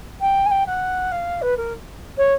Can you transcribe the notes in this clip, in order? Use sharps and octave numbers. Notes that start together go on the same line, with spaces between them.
G5
G#5
G5
F#5
F5
B4
A#4
C#5